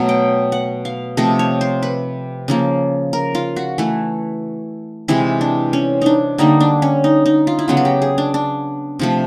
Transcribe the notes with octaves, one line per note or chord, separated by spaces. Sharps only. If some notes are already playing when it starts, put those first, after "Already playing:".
Already playing: B2 F#3 A3
G5
F#5
F5
C3 F3 A3 D#5
C#5
C5
B4
C#3 F3 A#3
A#4
F4
F#4
E3 A3
C3 E3 G#3 E4
D4
C#4
D4 D#4
D3 G3 A#3 D#4
D4
C#4
D#4
D#4
F4
E4
C#3 F#3 B3 F4
F#4
G4
G#4
D4
D4
C3 F3 A3